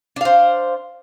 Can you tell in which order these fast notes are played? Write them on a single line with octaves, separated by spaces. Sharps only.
D4 F5 C5